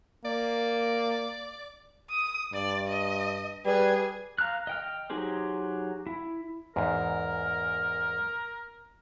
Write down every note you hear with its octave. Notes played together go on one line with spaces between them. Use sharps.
A#3 D5
D#6
G2 D5
D#5
G3 G#4 B4
F5 A#5 F6 F#6
D#5 G5 F6
F#3 D#4 G4 G#4 C5
E4
E2 G#2 A#4